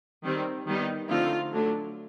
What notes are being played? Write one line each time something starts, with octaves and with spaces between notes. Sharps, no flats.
D#3 G3 C4
D#3 G3 B3 D#4
D3 F3 A3 C4 D#4 F4
D3 F#3 A3 D4